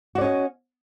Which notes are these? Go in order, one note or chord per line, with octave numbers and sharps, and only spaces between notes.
C#4 F#4 D5 D#5